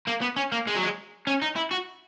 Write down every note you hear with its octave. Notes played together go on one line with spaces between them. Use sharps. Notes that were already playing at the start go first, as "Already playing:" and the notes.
A#3
B3
C#4
A#3
G#3
F#3
G#3
C#4
D#4
E4
F#4